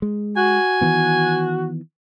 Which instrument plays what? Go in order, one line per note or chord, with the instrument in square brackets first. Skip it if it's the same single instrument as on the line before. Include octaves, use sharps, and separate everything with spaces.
[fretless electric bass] G#3
[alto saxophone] F#4 [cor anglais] G#5
[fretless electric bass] D#3 E3 B3